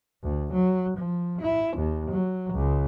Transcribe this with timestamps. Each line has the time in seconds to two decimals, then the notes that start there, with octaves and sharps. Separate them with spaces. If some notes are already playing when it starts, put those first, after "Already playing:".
0.23 D2
0.53 F#3
0.98 F3
1.42 E4
1.78 D#2
2.11 F#3
2.54 C#2